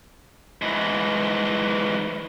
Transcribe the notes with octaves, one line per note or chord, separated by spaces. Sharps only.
G#2 E3